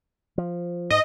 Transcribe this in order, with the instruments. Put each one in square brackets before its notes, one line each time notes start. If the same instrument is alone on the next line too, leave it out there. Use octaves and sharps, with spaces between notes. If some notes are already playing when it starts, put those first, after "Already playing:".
[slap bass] F3
[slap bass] G#2 [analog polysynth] D#5